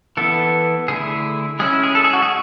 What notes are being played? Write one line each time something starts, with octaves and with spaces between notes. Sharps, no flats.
E3 B3 E4 A4
D3 A3 E4 G#4
G#3 C#4 E4 G#4
G#4
A4
G#4
F#4
G#4